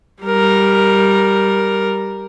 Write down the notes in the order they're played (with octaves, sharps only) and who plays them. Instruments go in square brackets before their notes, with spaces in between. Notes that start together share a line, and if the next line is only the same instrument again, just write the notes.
[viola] G3 A#4